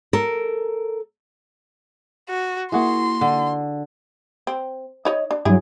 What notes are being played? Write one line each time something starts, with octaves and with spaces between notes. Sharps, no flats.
A4 A#4
F#4
A#3 E4 F#4 G#4 C6
D3
C4
D#4 C#5 D#5
D4
G2 F#3 E4 G#4